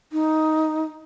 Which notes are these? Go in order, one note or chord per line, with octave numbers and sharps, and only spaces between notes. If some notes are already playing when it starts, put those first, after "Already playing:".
D#4